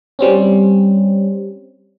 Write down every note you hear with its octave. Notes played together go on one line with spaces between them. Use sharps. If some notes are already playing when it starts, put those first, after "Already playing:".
G3 C4 C#4